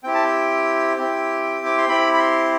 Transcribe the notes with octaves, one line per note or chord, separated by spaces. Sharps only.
C4 E4 G4 G5
A5
G5
C4 E4 G4
D6
C6
C4 E4 G4 B5
B5
C6